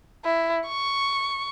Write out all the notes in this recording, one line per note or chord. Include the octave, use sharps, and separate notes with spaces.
E4
C#6